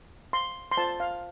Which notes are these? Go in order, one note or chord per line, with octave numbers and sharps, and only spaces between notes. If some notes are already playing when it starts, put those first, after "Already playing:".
C6
C6
F4 C5 A5
F5